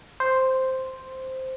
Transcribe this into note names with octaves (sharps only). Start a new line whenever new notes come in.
C5